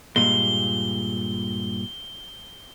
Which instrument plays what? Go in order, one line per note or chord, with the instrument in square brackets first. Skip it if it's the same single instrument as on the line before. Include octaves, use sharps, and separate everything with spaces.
[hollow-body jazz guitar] G2 A#2 G#3 [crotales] G7